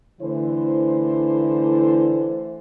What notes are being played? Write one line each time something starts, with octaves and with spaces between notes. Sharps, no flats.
D3 E3 A3 E4 C5